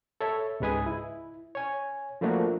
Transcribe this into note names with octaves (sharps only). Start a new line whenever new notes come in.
A4 C#5 E5
C#2 G#2 G#3 B4 G#5 D#6
E4
C#5 G#5
F3 A3 A#3 D4 F#4